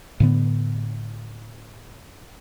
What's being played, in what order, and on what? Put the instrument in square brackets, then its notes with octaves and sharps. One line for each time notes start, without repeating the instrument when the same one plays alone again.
[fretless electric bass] A2 D3 B3